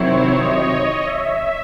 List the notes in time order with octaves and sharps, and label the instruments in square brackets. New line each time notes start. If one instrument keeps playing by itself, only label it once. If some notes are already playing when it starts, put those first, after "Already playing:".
Already playing: [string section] C3 D#3 F#3 C4 E4 [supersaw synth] C#5
[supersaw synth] D#5
E5